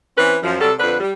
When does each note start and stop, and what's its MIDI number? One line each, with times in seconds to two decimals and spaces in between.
0.18 0.37 52
0.18 0.37 60
0.18 0.37 61
0.18 0.37 71
0.43 0.59 42
0.43 0.59 53
0.61 0.73 48
0.61 0.73 54
0.61 0.73 55
0.61 0.73 69
0.79 0.98 41
0.79 0.98 50
0.79 0.98 62
0.79 0.98 71
1.00 1.13 55